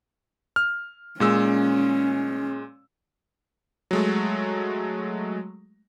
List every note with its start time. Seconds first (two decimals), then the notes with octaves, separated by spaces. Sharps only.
0.56 F6
1.20 A#2 G#3 C#4 E6
3.91 F#3 G#3 A3